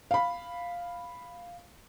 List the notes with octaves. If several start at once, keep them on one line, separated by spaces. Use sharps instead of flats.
F5 B5